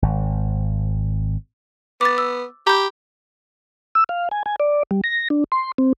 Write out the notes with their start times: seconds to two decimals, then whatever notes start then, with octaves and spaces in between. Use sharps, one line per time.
0.02 G#1
2.01 B3 D6 A6
2.18 E6
2.67 G4 A#5 B5 G6
3.95 E6
4.09 F5
4.31 G#5
4.46 G#5
4.60 D5
4.91 G3
5.04 A#6
5.30 D4
5.52 C6
5.78 C4